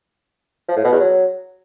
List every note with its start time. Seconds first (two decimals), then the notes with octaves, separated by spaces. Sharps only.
0.69 F3
0.76 A2
0.84 B2
0.92 E2
1.00 F#3